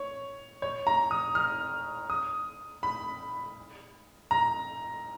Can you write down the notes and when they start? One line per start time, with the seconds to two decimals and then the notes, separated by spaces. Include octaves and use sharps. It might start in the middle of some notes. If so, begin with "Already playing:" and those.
Already playing: C#5
0.62 C#5
0.87 A#5
1.11 D#6
1.35 F6
2.10 D#6
2.83 B5
4.31 A#5